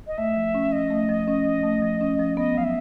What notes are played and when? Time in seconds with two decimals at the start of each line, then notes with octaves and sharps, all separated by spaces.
0.07 D#5
0.18 A3 E5
0.36 F3
0.54 C#4
0.72 F3 D#5
0.90 A3
1.09 F3
1.28 C#4
1.45 F3
1.63 A3
1.82 F3
2.01 C#4
2.19 F3
2.37 B3 D#5
2.55 F#3 F5
2.64 E5